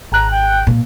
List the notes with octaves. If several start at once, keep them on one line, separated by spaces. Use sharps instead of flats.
G#1 A#5 F#6
G5
A#2